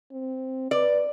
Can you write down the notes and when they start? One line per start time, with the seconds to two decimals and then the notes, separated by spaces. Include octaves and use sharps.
0.12 C4
0.71 B4 D5